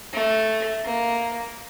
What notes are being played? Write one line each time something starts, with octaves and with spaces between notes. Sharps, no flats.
A3
A#3